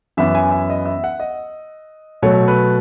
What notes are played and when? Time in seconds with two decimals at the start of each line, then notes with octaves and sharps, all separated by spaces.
0.17 F#2 E3 B3 E5
0.35 G#5
0.51 E5
0.70 D#5
0.86 E5
1.04 F#5
1.20 D#5
2.22 B2 F#3 A3 C#5
2.48 B4